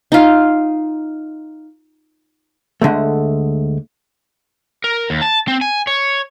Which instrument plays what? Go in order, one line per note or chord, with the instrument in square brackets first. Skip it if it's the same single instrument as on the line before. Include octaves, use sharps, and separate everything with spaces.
[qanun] D#4 F4
[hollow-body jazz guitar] D2 D3 G#3 A3
[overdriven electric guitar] A#4
D#2
A5
C4
G#5
C#5